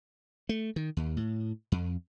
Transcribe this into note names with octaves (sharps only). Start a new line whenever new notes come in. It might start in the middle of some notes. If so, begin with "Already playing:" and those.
A3
D#3
D#2
A2
F2